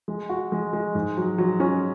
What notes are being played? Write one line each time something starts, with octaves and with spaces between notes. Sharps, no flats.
G#3
F#4
G#3
G#3
G#2
F#3
F#3
C#4